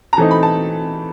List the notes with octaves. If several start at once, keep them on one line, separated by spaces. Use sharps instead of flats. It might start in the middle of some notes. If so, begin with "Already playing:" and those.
A#5
E3 A3 C4 D#4 A5
B5
A5